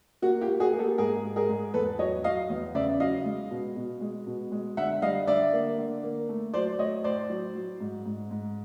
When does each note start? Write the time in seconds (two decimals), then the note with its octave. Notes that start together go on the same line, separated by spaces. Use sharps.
0.22 A#3 F#4
0.41 F4 G4
0.48 A#3
0.60 F#4 G#4
0.73 A#3
0.79 G4 A4
0.98 G#2 G#4 A#4
1.23 G#2
1.36 G#4 A#4
1.49 G#2
1.74 E2 A4 B4
1.99 F#3 C#5 D#5
2.24 F#3 D#5 F5
2.50 E2
2.75 C#3 D5 E5
3.00 F#3 D#5 F5
3.25 G#3
3.51 B2
3.76 B2
4.01 G#3
4.27 B2
4.52 G#3
4.77 D3 E5 F#5
5.02 G3 D#5 F5
5.27 D3 D5 E5
5.53 A#3
5.78 D3
6.03 A#3
6.29 A3
6.54 F#3 C5 D5
6.79 A3 C#5 D#5
7.04 A2 C5 D5
7.30 F#3
7.55 F#3
7.80 G#2
8.06 G#2
8.31 G#2